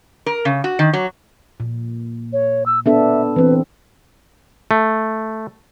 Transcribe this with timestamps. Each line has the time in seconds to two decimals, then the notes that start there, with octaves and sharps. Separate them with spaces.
0.26 A#4
0.45 C#3
0.64 F#4
0.79 D#3
0.93 F#3
1.60 A#2
2.33 C#5
2.66 E6
2.86 B3 D4 A4 E5
3.36 E3 C4 B4
4.71 A3